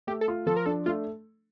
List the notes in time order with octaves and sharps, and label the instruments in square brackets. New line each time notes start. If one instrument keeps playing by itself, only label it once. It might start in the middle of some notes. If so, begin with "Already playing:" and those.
[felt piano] A3 [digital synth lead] G4
[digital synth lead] A4
[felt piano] F4
[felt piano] F3 [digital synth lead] A4
[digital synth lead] A#4
[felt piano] D4 [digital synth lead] A4
[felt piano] A3 [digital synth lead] F4